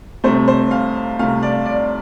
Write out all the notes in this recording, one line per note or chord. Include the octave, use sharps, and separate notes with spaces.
C2 C3 A3 C5
C5
F5
C2 C3 A3 F5
D5
D5